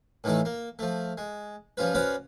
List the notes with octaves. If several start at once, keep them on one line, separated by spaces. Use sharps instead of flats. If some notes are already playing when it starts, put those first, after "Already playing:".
A2 D#3 E3 A3 A4
A#3
F3 A3
G#3
F3 G3 C#4 F4 B4
C#4 F#4 B4 C5 D5 F5